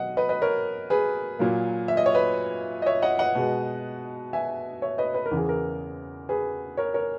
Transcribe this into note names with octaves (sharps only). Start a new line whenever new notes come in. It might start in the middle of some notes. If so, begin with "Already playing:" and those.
Already playing: B2 F#3 D#5 F#5
B4 D#5
B4 D#5
A#4 C#5
G#4 B4
A#2 F#3 A#3
E5
D#5
C#5
B4 D#5
D#5
C#5 E5
D#5 F#5
D#5 F#5
B2 G#3
E5 G#5
C#5 E5
B4 D#5
B4
A#4
E2 C#3 E3
G#4
A#4
G#4 B4
A#4 C#5
A#4 C#5